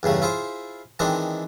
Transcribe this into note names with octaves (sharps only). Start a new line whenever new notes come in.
E2 G2 C#3 A3
E4 F4 G#4 C5
D#3 E3 G#3 C4 D4 D#4